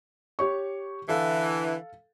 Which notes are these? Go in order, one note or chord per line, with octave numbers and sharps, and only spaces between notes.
G4 C#5 C#6
D3 E3 A4 F5